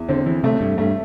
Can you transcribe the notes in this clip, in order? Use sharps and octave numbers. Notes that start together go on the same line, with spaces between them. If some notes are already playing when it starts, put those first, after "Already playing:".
Already playing: E2
D3 C4
E3
C3 A3
G2
G2 A3